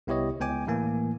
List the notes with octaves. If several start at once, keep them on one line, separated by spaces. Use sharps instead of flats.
C2 B3 E4 G4 C#5 D#5
C#2 B3 G5 G#5 D6
A2 E3 A#3 G#5